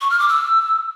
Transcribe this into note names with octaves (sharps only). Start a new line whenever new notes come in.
C#6
F6
D6
E6